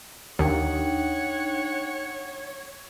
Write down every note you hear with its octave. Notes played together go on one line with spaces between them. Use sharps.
D#2 D4 D#4 C#5 F#5 G5